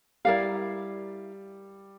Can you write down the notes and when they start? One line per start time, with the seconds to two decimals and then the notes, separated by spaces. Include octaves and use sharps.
0.25 G3 E4 A#4 D5 F5